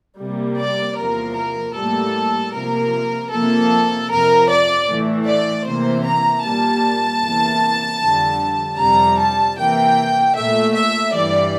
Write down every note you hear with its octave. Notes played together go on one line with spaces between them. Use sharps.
C3 G3 A#3
D5
E2 C3 F3 A#3 A#4
A#4
A2 G3 A#3 A4
C3 F3 A#3 A#4
C3 F3 A#3 A4
F2 C3 F3 A#4
D5
A2 E3 A3
D5
C3 E3 A#3 C5
A#5
A#2 G3 A#3 A5
E2 C3 E3 A#3
F2 D3 G3
F2 C3 G3 A#5
A5
C3 E3 A#3 G5
A#2 A3 E5
E5
G2 E3 G3 D5